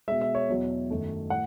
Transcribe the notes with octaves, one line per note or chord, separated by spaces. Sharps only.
B2 G#3 E5
E5
C#5
E2 B2 F#3
F#2 D#3 A3
A2 F#5